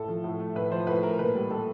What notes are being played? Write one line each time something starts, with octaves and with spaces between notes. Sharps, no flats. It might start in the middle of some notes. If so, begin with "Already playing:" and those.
Already playing: A2 A4
F3
A2
A3
A2 B4
F3 C5
A2 B4
A3 A#4
A#4
A#2 B4
G3
G3 A4